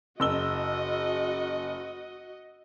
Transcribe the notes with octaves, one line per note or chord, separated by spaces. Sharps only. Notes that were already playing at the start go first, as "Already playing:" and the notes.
F#1 F#4 D#5 E6 G7